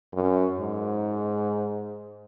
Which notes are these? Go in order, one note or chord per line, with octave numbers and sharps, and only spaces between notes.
F#2
G#2